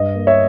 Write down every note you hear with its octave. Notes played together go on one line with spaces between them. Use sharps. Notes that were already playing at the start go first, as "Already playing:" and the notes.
Already playing: G2 D#5
A#3
C#5 E5